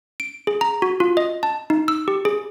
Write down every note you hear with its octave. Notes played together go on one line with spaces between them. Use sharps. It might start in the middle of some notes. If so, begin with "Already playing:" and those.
D7
G#4
A#5
F#4
F4
D#5
A5
D#4
E6
G4
G#4